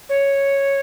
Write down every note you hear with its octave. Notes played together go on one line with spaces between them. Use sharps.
C#5